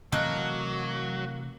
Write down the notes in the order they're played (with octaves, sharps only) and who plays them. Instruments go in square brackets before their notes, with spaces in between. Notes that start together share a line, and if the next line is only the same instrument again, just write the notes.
[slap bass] C3 E3 A3 [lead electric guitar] F#3 [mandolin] A#3 F#6 [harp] D#5 A5